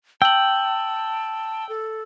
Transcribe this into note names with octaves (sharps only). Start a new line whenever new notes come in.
G5 A5 E6 F#7
A4